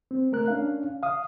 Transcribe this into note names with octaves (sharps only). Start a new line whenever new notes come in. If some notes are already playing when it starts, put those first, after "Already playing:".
C4
A3 A#4 F#6
C#4 D4 F5
F5 D#6